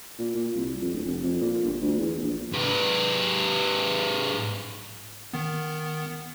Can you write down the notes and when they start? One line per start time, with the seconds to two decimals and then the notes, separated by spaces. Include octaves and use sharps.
0.19 A#2
0.35 A#2
0.56 C2
0.82 F2
0.94 D1
1.06 F1
1.24 F2
1.41 A#2
1.64 G1
1.82 D2
1.98 E2
2.21 A#1
2.52 G#2 B4
5.33 D#3 B3